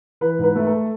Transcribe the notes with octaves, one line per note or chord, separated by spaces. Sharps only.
E3 B4
G#2 B4
A3
A4